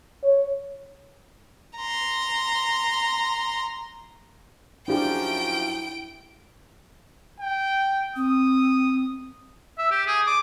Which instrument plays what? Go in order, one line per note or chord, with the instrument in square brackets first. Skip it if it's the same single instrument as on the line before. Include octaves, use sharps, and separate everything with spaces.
[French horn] C#5
[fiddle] A#5 C6
[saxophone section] F#2 F3 [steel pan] D4 G4 G#4 [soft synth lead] E4 [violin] G5 D7
[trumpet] G5
[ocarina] C4 [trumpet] D#6
[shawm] E5
G4
G#4
D6